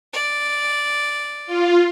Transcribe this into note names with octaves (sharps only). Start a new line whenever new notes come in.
D5
F4